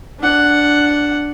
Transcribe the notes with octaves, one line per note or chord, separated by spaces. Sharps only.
D4 F#5